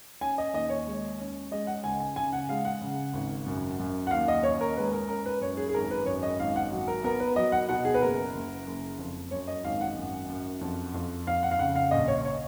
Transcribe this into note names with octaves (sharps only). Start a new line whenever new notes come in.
C#4 G#5
D#5
D#2 D#5
C#5
G#3
C#4
G#3 D#5
F#5
C#2 G#5
G#5
C#3 G#5
F#5
G#3 F5
F#5
C#3
G#1
F#2
F#2
F#5
D#2 F5
D#5
C#4 C#5
A#4
G#3 B4
A#4
C#4 A#4
B4
F#2 C#5
G#4
G#4
G#1 A#4
B4
F#2 C#5
D#5
G#1 F5
F#5
F#3
A#4
B3 A#4
B4
F#3 D#5
F#5
B2 F#5
G#4
B4
F#1 A#4
F#1
F#1
F2
F#2 C#5
D#5
G#1 F5
F#5
F#2
F#2
F2
F2
F2 F5
F#5
F5
C#3 F#5
F5
A#1 D#5
C#5
C#5